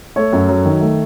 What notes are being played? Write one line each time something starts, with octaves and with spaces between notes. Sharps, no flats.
A3 A4 C#5
F#2
F#3
D#3
A3